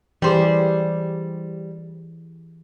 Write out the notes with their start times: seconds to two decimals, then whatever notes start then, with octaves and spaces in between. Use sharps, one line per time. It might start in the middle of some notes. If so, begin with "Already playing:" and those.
0.22 E3 G3 G4 G#4 C5